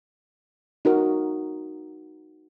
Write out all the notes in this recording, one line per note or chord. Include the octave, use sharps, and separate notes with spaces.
D#4 F#4 A#4